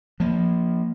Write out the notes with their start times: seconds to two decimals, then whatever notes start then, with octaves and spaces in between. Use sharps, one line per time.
0.20 F3 A#3